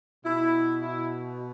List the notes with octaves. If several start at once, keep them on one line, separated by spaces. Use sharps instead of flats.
B2 E4
E4